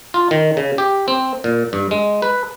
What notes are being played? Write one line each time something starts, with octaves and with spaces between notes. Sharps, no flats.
F4
D#3
C#3
G4
C4
A#2
G2
G#3
B4